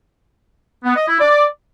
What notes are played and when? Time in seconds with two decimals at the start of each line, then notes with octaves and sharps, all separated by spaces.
0.85 B3
0.97 D#5
1.09 E4
1.20 D5